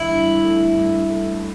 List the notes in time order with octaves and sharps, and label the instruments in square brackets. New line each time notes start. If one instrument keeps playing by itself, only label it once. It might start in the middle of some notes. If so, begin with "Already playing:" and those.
Already playing: [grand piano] G1 E3 [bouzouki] E4
[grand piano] G2
A3
G2
A3